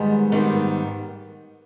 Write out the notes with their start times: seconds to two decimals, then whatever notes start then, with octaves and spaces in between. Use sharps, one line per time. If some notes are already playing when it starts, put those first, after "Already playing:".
Already playing: G#2 D#3 G3 G#3 B3
0.32 G#2 D#3 G3 B3